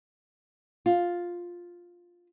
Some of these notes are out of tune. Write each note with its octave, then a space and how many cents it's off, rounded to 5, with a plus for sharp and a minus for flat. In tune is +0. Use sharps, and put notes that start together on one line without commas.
F4 +5